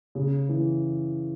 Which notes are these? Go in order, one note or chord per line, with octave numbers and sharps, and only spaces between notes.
C#3
E3